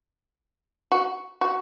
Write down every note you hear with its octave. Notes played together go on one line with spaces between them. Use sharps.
F#4
F#4